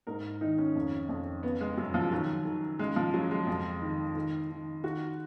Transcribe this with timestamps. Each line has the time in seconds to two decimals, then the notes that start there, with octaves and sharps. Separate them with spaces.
0.07 G#2 A#4
0.41 D#3 D#4
0.58 C#4
0.75 F2
1.09 F2
1.43 C#3 B3
1.61 G#3
1.77 F#2 F#3
1.94 F3
2.12 D#3 F#3
2.45 D#3
2.79 C#3 G#3
2.96 F3
3.14 C#3 F#3
3.31 G#3
3.47 F2
3.82 D#3
4.15 D#3
4.50 D#3
4.83 D#3 F#4